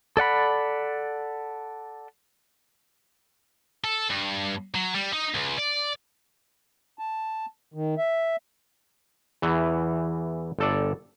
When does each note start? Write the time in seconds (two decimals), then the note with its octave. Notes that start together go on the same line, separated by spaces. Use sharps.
0.17 A4 D5 F#5 B5
3.84 A4
4.10 G2
4.75 F#3
4.94 G3
5.13 D#4
5.34 C#2
5.58 D5
6.99 A5
7.74 D#3
7.98 E5
9.42 E2 E3
10.59 G1 A4 D5